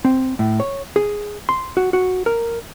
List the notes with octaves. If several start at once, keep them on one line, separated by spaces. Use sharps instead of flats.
C4
A2
C#5
G#4
C6
F#4
F#4
A#4